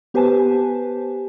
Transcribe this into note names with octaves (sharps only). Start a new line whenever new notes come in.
B3 G4 B4 C5 G#5 A5